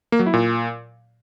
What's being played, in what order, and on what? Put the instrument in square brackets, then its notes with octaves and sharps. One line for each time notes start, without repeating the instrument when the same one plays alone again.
[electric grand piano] A#3
F#3
E4
A#2